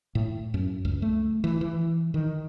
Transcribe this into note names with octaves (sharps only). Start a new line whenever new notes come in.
A2
F#2
C#2
A3
E3
E3
D#3